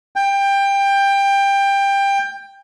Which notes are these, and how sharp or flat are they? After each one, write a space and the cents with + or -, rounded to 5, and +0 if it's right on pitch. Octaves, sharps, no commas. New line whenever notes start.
G5 +20